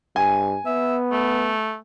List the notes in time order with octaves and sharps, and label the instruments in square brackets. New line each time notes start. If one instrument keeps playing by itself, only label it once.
[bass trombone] G2 [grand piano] G#5
[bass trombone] B3 [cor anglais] E5
[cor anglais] A3